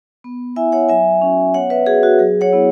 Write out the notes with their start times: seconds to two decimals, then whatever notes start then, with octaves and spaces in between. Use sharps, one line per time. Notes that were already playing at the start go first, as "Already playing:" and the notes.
0.24 B3
0.56 E4 E5 G#5
0.72 C#5 F#5
0.89 F#3 E5 G#5
1.22 C#4 F#4
1.54 B3 C#5 F#5
1.70 B4 E5
1.86 F#4 G#4
2.03 F#4
2.19 F#3 G#4
2.41 C#5 F#5
2.53 B3 E4